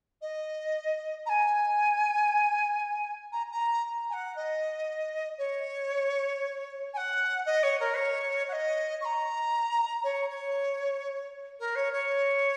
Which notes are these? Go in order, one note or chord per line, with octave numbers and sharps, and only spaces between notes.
D#5
A#5
G#5
A#5
A#5
G#5
F#5
D#5
C#5
G#5
F#5
D#5
C#5
A#4
C#5
F#5
D#5
C#6
A#5
C#5
C#5
A#4
C#5
C#5